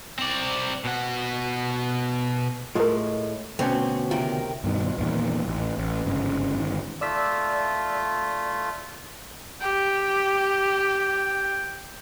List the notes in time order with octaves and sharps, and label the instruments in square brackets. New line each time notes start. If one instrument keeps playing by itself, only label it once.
[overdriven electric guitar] C4 D5
B2 F#5
[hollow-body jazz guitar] A2 G#3 [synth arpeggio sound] F4 A#4
[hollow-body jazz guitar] D2 B2 C#4 [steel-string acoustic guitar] C4
[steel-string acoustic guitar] C3 D#3 A#4 [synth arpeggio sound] F4
[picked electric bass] G2 B2 D#3
E2 A#2 D#3
A1
A1
G1 G#2 C#3
G1 D#3
[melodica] A3 F4 [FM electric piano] D5 E6 B6
[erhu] G4 [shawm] G5